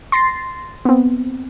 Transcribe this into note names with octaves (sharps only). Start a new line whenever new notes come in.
C6 A6 A#6 C7
B3 C4